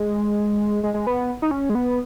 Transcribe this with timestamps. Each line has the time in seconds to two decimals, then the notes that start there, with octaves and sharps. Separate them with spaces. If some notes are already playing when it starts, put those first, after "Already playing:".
Already playing: G#3
0.83 G#3
0.94 G#3
1.07 B3
1.42 D#4
1.51 C#4
1.69 G#3
1.75 B3